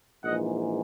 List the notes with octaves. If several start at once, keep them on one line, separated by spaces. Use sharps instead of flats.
A#1 G#2 E3 D#5 F#5